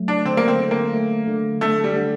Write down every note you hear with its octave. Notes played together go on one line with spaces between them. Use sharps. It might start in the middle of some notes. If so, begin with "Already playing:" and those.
Already playing: F#3 A3
D4
D3 C4
A#3
C4
D3
A#3
A3
D3
D3 A3
G3
D3